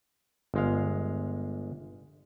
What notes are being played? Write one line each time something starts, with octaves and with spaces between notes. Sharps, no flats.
G1 G#3 F5